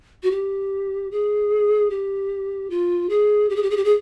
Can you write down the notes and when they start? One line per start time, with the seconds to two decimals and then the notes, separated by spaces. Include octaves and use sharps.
0.23 F#4
0.31 G4
1.11 G#4
1.90 G4
2.70 F4
3.09 G#4
3.49 G4
3.56 G#4
3.63 G4
3.70 G#4
3.77 G4
3.85 G#4